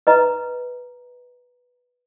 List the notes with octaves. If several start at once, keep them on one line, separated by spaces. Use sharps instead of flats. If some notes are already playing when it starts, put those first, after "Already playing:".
B4 D#5 A#5